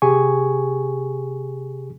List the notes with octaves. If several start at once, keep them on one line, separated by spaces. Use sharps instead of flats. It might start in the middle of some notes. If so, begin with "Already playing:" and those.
C3 G4 G#4 G#5 C#6